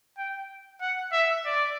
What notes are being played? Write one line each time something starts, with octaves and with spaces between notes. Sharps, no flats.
G5
F#5
E5
D5